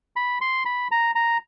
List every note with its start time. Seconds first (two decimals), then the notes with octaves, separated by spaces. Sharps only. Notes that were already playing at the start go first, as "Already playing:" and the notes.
0.16 B5
0.41 C6
0.66 B5
0.91 A#5
1.15 A#5